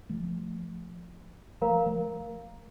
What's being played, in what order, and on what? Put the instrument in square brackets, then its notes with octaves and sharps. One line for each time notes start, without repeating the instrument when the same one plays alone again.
[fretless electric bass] F3 A3
[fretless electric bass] F3 A3 [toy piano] A#4 F5 A#5
[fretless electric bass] F3 A3